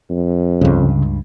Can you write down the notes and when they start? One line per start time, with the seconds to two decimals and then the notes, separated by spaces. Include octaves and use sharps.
0.10 F2
0.61 C#2 G2 C#3